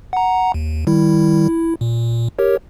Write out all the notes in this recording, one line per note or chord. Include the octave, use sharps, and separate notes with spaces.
F#5 A#5
D#2
D#3 G3 E4
E4
A#2
G4 A#4 C#5